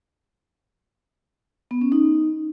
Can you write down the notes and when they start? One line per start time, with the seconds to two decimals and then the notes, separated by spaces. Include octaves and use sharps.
1.71 B3
1.81 C#4
1.92 D#4